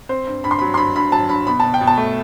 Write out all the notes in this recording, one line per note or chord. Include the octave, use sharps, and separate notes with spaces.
C4 C5
G2
G2 B5
C6
B5
F#3
C6
G2 B5
G2 B5
F#3 A5
G2 B5
B2 B5
B2 A5
G5
B2
A5
A3